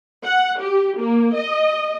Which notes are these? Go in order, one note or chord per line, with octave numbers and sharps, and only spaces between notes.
F#5
G4
A#3
D#5